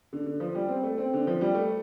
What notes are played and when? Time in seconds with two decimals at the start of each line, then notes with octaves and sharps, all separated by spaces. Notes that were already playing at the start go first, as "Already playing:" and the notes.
0.13 D3
0.26 D3
0.40 F3
0.55 G3
0.69 C4
0.83 A3
0.98 C4
1.13 D3
1.27 F3
1.41 G3
1.55 A3